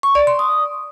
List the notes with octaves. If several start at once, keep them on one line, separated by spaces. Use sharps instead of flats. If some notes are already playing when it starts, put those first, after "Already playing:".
C#6
D5
C6
D#6